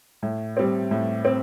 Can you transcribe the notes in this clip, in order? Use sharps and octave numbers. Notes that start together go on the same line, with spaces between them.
A2
G3 C4
A2
C4